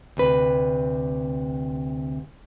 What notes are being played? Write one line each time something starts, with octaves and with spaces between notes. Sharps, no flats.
D2 C3 B4